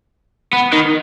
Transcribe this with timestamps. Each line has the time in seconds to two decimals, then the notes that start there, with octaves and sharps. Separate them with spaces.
0.53 B3
0.73 D#3